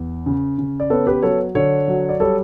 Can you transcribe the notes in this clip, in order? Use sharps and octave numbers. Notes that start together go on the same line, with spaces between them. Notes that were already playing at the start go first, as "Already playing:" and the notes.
Already playing: E2
C#3
C#3
D5
B3 A4 C#5
G4 B4
F#3 A4 C#5
D3 A4 C#5
F#3
D5
G3 A4 C#5